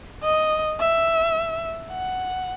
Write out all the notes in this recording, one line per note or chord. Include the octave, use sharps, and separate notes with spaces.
D#5
E5
F#5